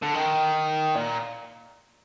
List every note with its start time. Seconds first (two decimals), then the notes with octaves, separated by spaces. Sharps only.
0.03 D3
0.14 D#3
0.96 A#2